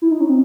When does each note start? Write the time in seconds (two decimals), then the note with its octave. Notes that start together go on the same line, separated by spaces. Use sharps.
0.02 E4
0.11 D#4
0.20 C#4
0.29 C4